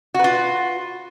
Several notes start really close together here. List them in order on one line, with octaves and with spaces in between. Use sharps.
F#4 B4 F4